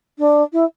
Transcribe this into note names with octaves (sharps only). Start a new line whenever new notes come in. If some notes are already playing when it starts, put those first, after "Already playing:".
D4
E4